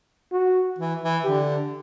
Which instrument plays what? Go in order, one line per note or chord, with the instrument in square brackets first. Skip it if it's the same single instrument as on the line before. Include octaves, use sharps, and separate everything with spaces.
[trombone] F#4
[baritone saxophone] E3
E3
[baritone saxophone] D3 [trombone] G4